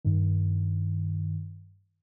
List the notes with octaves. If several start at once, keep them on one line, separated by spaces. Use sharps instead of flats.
G2 D#3